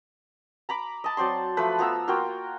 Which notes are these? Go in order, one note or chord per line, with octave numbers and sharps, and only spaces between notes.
A#5 B5 D6
D#5 A5
F#3 C4 D5 C6
F3 A3 B4 B5
F3 B3 A#5 E6
A#3 F4 F#4 G5